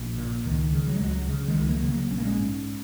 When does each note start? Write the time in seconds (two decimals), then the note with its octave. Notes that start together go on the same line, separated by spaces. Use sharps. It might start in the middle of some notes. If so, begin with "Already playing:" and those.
Already playing: A#1
0.17 A#2
0.45 C#2 D#3
0.73 C#3
0.86 F#3
0.95 G#3
1.00 C#2 F#3
1.28 C#3
1.48 D#3 G#3
1.55 C#2
1.69 F#3 A#3
1.83 C#3
1.90 F#3 A#3
2.10 A#1 C#4
2.18 A#3
2.25 G#3 C#4
2.38 G#2